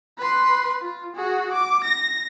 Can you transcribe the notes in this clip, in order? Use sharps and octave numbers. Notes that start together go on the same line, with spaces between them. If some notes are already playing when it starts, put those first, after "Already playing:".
B4 C6
F4
F#4 G#4
D6
A#6